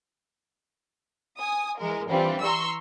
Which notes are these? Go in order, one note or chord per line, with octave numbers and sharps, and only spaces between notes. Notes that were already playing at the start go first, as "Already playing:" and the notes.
G#5 D#6
E3 G#3 A#4
E3 G3 C4 D4 F4
A#5 C6 C#6 E6